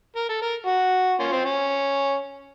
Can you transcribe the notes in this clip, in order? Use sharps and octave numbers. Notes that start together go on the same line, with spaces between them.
A#4
A4
A#4
F#4
A#3 C#4 F4
C4
C#4